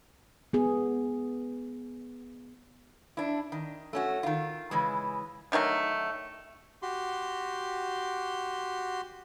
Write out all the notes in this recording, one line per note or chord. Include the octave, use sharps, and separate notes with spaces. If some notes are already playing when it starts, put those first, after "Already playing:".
B3 G#4
D4 E4
D#3
A3 C#4 F#4
D#3 F4
C#3 E3 G#3
D3 D#3 F#3 A3
F#4 G4 C6